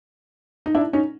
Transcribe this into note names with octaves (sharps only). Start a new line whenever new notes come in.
D#4
D4 E4
C#4 D#4